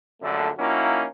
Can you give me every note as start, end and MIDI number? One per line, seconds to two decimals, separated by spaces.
0.22 0.49 34
0.22 0.49 42
0.22 0.49 50
0.22 0.49 57
0.58 1.05 53
0.58 1.05 58
0.58 1.05 61
0.58 1.05 63
0.58 1.05 64
0.58 1.05 66